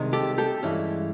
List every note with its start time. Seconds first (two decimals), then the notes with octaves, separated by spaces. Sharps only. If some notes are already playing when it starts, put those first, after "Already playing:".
Already playing: C2 C3 D#3 G#3
0.13 G4 A4
0.38 G4 A4
0.63 G2 E3 G#3 C#4 E4